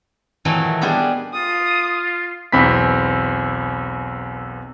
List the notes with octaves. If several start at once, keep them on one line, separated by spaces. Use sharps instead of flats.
A#2 D#3 E3 F#3 A3 A#3
G3 B3 D4 G4 G#4 C5
F4 D#6
B1 E2 C4 B5 B6